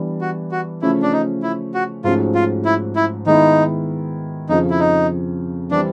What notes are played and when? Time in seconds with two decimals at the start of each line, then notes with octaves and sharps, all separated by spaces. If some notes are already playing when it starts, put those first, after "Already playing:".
Already playing: E3 G3 B3 D4
0.21 F#4
0.51 F#4
0.82 C#3 F3 A3 C#4 E4
1.02 D4
1.13 D#4
1.43 E4
1.74 F#4
2.04 G#2 F3 A3 C#4 F4 F#4
2.35 F4
2.65 E4
2.96 E4
3.26 D#3 G#3 B3 D#4 E4
4.49 F2 C#3 F3 D#4
4.70 E4
4.79 D#4
5.71 E3 G3 C4 D4